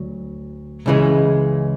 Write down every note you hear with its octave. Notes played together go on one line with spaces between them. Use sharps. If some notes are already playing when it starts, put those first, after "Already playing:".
Already playing: D2 F#3
C#2 C#3 E3 G#3